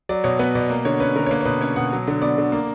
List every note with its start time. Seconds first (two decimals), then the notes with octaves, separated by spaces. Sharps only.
0.09 F#3 D5
0.24 B2 C#5
0.39 B3 B4
0.55 B2 D5
0.70 A#3
0.85 D3 C#5
1.00 C#4 B4
1.15 D3 A#4
1.26 C#5
1.31 A#3 B4
1.41 C#5
1.45 B2 B4
1.61 C#4 C#5
1.76 B2 F#5
1.92 F#3
2.08 D3
2.22 B3 D5
2.38 D3
2.52 A#3